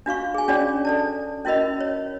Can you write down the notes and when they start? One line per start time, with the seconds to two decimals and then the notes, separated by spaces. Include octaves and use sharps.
0.06 D4 F#4 F5 C#6
0.34 G#4 G#5
0.48 C#4 D4 F#4 G#4 C#5 D5
0.85 A4 D5 A5
1.45 C#4 E4 F#4 A#4 D#5 B5
1.80 C#5